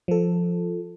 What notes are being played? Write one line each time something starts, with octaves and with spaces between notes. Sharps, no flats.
F3 A4